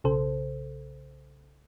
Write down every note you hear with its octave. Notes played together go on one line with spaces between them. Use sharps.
B1 C#3 A4 C5